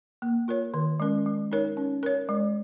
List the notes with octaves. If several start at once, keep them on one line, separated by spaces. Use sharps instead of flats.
A#3
F4 A#4 C#5
D#3
G#3 C#4 A#4
G#3
D#4 A#4 C#5
C#4
A#4 C#5
G#3